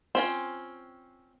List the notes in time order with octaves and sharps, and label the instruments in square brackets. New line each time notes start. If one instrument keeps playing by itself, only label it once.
[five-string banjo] C4 C#4 F4